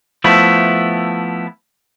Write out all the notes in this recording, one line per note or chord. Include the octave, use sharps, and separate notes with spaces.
F3 A3 B3 E4